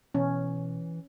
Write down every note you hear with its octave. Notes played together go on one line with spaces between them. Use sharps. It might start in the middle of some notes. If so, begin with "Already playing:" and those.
B2 E3 C#4